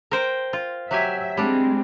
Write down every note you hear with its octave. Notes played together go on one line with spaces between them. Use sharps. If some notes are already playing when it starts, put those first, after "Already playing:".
A#4 C5 G5
F4
F#3 G4 E5 G#5
G3 G#3 C4 D4